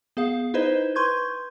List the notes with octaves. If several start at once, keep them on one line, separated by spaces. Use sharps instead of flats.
B3 G#4 F5
D#4 E4 B4 C5 D#5
B4 C6 C#6 G6 G#6